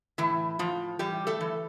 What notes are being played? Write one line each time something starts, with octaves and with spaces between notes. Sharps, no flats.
A2 E3 E4
A2 F3 F4
E3 G3 G4
A3 A4
E3